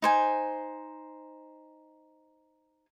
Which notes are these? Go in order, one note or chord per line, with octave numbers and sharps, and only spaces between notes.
D#4 C5 G#5